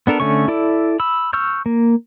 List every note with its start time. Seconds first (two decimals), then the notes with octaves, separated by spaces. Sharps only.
0.07 B3 D4 A4 A#4
0.20 D3 A3 C#4 C#6
0.48 E4 A4 D5
1.00 B5 E6
1.33 C#6 E6 F6 G6
1.66 A#3